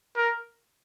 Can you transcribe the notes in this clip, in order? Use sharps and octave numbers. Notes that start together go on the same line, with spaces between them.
A#4